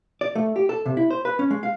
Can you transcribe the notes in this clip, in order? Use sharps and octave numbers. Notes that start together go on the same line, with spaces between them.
D5
A3
G4
A4
C3
E4
C5
B4
C#4
G#3
F5